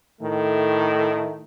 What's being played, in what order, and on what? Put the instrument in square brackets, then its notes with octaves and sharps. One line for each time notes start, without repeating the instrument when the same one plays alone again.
[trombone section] A2 D#3 A3